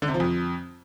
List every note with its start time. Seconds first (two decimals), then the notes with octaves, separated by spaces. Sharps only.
0.02 D3
0.08 C3
0.14 F3
0.20 F2